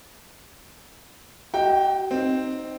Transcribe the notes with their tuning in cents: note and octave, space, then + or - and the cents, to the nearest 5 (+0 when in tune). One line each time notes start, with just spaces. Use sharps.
F#4 +40 D#5 +0 G5 +0
C4 +0 D#4 +0